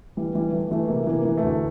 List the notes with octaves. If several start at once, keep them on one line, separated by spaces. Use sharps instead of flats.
E3 G3
E3 G3
E3 A3
E3 A3
C3 A#3
E3
A#3
E3
A3
D2